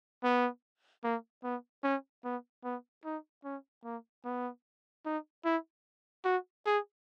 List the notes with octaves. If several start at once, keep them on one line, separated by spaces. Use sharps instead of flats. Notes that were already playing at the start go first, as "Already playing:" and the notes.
B3
A#3
B3
C#4
B3
B3
D#4
C#4
A#3
B3
D#4
E4
F#4
G#4